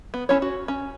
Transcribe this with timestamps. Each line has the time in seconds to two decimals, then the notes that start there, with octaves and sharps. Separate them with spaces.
0.14 B3
0.29 C#4 E4 A4 C#5
0.42 F#4
0.68 C#4